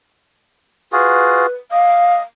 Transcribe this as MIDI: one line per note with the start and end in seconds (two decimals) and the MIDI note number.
0.92 1.46 65
0.92 1.46 66
0.92 1.46 68
0.92 1.52 71
1.72 2.23 75
1.72 2.16 77